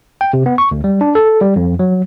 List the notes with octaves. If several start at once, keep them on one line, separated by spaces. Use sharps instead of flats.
G5
C3
B3
C#6
D2
G3
D4
A4
G3
F2
F#3